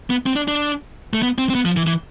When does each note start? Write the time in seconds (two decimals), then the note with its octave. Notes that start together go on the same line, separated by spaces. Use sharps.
0.10 B3
0.26 C4
0.36 D4
0.48 D4
1.13 A3
1.22 B3
1.38 C4
1.50 C4
1.55 B3
1.65 F3
1.77 E3
1.87 E3